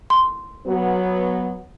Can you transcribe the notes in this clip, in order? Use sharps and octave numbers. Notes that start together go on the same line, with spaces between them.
C6
F#3 B3